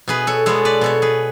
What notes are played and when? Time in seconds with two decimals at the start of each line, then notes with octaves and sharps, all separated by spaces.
0.08 B2 G#4 B4
0.27 A4 C#5
0.46 G#3 B3 A4 C#5
0.65 B4 D5
0.81 B2 A4 C#5
1.02 G#4 B4